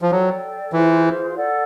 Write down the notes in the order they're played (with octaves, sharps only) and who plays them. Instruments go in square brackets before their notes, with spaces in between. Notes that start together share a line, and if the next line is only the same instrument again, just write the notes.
[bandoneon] F3
[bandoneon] F#3 [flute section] A4 D5 G5
[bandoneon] E3 [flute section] F4 G#4 C5
[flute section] A4 D5 F#5